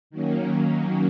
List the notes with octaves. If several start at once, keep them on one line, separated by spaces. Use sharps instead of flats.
D#3 F#3 A#3 C#4